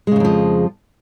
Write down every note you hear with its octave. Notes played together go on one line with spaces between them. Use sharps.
F2 G#2 C#3 F3 G#3